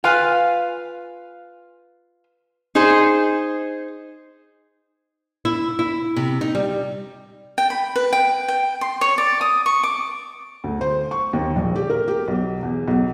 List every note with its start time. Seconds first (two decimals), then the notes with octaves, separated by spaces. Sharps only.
0.04 F4 B4 F5 G#5
2.75 D#4 G#4 C5
5.45 E4
5.79 E4
6.16 C3
6.41 D#4
6.55 G3
7.58 G5
7.70 B5
7.96 B4
8.13 G5
8.48 G5
8.81 C6
9.01 C#5
9.18 D5
9.41 D#6
9.66 C#6
9.83 D6
10.64 D2
10.81 C5
11.11 C#6
11.33 D#2
11.56 A#1
11.75 G4
11.90 A#4
12.08 G4
12.28 B1
12.63 E2
12.87 B1